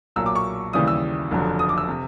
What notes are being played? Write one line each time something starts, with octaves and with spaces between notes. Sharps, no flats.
B1 A#2 F#3 E6
D6
C#6
D#2 C#3 E3 G3 D#6
E6
F1 F2 D3 F#3
D#6
D6
E6
C3